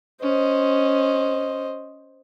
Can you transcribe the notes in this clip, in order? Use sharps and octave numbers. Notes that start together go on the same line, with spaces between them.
C#4 C5 D#5